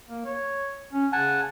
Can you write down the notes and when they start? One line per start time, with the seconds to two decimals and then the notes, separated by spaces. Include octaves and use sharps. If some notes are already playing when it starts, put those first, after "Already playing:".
0.09 A#3
0.26 C#5
0.93 C#4
1.12 C#3 F#5 G#5 A5